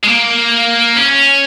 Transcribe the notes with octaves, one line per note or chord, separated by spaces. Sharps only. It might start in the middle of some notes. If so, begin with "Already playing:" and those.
G#3
A#3
C#4